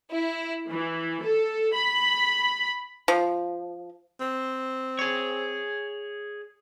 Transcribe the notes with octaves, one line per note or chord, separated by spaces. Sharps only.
E4
E3
A4
B5
F3
C4
G#4 C#5